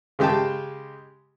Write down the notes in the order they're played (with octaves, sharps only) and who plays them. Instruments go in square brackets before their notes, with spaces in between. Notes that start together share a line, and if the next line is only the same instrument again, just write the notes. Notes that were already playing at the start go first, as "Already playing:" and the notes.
[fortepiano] C#3 G#3 G4 G5 A5